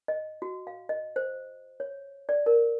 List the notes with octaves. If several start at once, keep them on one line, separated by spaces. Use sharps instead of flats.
D#5
F#4
F5
D#5
C5
C#5
D5
A#4